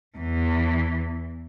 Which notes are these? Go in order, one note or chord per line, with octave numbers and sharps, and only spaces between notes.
E2 E3